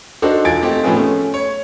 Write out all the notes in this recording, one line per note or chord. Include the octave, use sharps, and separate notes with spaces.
D4 D#4 F#4 A4 C5
E1 F4 G#5 G#6 A6 D7
A3 C4 D#4 G4
A2 F3 B3 C#4 G#4
A3 C#4
C#5